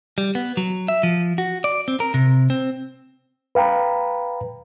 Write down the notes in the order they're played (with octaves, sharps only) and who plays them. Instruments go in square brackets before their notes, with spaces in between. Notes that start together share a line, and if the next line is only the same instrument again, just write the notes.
[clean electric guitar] G3
B3
F#3
E5
F3
F#4
D5
C4
A#4
C3
C4
[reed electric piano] B4 F5 G5 A#5 B5